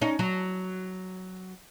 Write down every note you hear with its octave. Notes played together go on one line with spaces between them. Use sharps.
C#4 D#4
F#3